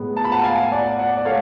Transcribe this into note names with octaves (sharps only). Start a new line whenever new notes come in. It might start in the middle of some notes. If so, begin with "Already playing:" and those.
Already playing: A2 G#3 B3
A5
B5
F#5 A5
F5 G#5
D5 F#5
D5 F#5
D5
A3 C#5 F5